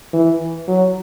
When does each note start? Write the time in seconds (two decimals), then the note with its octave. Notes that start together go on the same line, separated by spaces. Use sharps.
0.13 E3
0.67 F#3